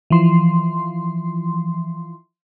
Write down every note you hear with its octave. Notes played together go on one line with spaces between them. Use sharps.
E3 F3 C6